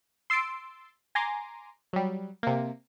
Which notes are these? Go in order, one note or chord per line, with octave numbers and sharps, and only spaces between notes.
C6 E6 A6 C7 D7
G#5 A#5 C6 D6
F#3 G3
C3 A#3